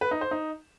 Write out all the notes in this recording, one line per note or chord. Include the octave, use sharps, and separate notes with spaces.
B4
D#4
C5
D#4